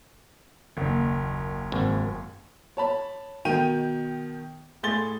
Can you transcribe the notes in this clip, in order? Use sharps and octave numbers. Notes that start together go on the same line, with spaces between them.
F#1 D#2
G#1
C#5 A5 B5
B2 D#3 G5 D#7
A2 G#4 C6 A6 G7